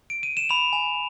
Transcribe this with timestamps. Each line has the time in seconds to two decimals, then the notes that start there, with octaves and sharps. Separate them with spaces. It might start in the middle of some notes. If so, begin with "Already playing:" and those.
0.10 D7
0.23 D#7
0.37 E7
0.49 B5 F7
0.73 G#5